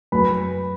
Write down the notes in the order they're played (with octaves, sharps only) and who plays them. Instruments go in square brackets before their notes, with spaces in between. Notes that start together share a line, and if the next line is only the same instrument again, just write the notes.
[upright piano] F#2 B4 B5